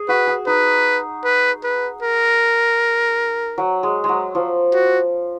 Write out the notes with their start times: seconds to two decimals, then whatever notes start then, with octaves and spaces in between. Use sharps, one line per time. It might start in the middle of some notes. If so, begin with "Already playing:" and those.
Already playing: G#4
0.09 F#4 B4
0.27 G#4
0.47 D#4 B4
1.24 B4
1.63 B4
2.02 A#4
3.58 F#3
3.83 G#3
4.04 F#3 G#3
4.35 F3
4.73 F#4